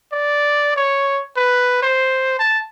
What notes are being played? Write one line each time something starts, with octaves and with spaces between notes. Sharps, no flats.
D5
C#5
B4
C5
A5